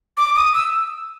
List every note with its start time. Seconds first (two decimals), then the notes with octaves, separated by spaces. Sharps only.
0.17 D6
0.36 D#6
0.54 E6